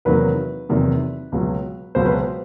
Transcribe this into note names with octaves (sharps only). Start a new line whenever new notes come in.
E2 C3 D#3 F#3 A#3 B4
E2 C3 D#3 F#3 A#3
C#2 B2 F#3
C#2 B2 F#3 C5
B4
C5